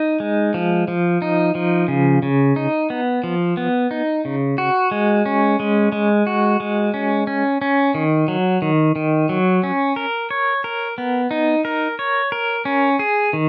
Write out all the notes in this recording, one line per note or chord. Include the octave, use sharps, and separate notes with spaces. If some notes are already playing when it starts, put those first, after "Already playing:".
Already playing: D#4
G#3
F3
F3
D#4
F3
C#3
C#3
D#4
B3
F3
B3
D#4
C#3
F#4
G#3
C#4
G#3
G#3
F#4
G#3
C#4
C#4
C#4
D#3
F#3
D#3
D#3
F#3
C#4
A#4
C#5
A#4
B3
D#4
A#4
C#5
A#4
C#4
G#4
D#3